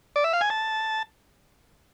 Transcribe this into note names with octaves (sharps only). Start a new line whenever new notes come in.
D5
E5
F5
G#5
A5